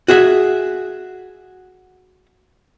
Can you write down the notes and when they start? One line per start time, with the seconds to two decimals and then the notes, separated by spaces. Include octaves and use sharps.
0.08 F#4 G#4 E5